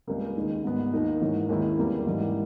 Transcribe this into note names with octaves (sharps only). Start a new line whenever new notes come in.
C#2 C#3 G3 A#3
D#2 D#3 G#3
G#2 G3 B3
D#2 D#3 A#3 D#4
G#2 E3 A#3 C#4
D#2 D#3 G#3 C#4 E4
E2 C#3 G3 A#3
G#2 E3 G3 A#3